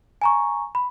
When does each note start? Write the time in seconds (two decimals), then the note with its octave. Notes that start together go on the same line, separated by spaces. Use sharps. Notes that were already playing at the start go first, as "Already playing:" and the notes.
0.22 G#5 A#5 C#6
0.75 B5